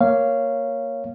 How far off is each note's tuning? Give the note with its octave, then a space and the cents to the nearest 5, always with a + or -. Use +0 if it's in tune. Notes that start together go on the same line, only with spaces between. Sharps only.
A#3 +0 C#5 +0 F5 -15